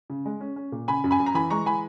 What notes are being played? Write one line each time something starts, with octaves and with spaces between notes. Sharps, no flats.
C#3
G#3
C#4
C#4
A#2
C#3 G#5 B5
F#2
G#5 B5
F#2
A#5
E3 G#5 B5
G#3 A#5 C#6
E3 G#5 B5